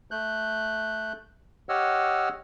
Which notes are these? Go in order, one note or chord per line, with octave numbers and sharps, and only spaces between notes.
A3 F#6 G6
G4 C#5 D#5 F#5 E6 F6